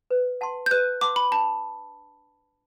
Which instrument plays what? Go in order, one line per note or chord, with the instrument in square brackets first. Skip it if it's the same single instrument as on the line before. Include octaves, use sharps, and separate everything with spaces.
[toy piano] B4
F#5 A5 C6
[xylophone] G6
[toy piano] B4 [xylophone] F#6
[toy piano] F#5 A5 C6 [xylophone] D6
[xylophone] B5
[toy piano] D4 [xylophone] A5